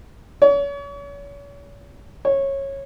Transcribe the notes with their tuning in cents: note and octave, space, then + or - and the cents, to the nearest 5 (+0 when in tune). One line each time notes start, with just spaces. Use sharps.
C#5 +40
C#5 -15